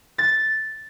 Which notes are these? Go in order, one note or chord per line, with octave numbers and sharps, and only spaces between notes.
A6